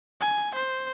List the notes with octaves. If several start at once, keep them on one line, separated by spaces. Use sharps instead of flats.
G#5
C5